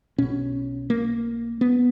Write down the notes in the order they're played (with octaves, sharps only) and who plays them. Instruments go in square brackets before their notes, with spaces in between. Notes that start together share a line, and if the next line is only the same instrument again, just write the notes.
[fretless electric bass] B1 B2 C#4
A#3
B3